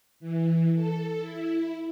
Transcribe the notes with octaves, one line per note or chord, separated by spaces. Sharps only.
E3
A4
E4